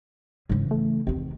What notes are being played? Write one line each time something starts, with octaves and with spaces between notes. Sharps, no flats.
G#2 C#3 E3
A3
E2 C3 D#3